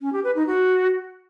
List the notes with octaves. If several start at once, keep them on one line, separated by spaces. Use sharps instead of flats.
C#4
G4
B4
D#4
F#4